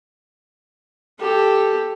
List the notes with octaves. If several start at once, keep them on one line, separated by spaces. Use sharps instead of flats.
G4 A4